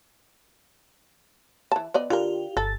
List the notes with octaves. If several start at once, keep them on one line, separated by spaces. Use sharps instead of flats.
E3 A5
B3 D5 D#5
D3 F4 G4 A#4
G1 A4 A6